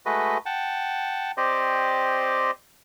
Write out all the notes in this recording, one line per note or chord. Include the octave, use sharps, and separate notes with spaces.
G#3 A3 F#4 B4 D#5
F#5 G5 A5
C4 G4 C5 D5 D#5